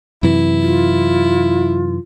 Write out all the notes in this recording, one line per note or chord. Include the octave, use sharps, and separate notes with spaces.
F#2 C3 E3 E4
F4